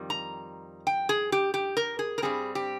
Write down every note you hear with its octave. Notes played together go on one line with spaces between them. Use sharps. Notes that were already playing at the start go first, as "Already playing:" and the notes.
Already playing: F2 D#3 G3
A#5
G5
G#4
G4
G4
A#4
G#4
A#4
G2 G3 C4 G#4
G4